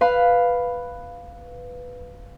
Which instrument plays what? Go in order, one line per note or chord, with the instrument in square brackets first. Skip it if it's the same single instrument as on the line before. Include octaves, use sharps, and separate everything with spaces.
[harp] B4 F5 B5